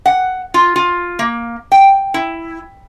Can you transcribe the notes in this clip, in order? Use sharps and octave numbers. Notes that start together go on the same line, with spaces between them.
F#5
F4
F4
A#3
G5
E4